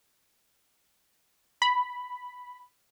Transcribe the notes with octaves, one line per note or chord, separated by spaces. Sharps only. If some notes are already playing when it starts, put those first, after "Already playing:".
B5